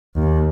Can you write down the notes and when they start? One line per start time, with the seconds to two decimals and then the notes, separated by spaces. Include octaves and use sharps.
0.16 D#2